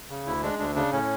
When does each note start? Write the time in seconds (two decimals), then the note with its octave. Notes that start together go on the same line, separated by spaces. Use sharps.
0.10 C#3
0.26 D2 E4
0.43 G#3 D4
0.59 D2 D4
0.75 C#3 D4
0.92 A2 C#4